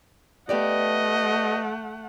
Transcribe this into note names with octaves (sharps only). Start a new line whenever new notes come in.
A3 B3 G4 D5 D#5 F#5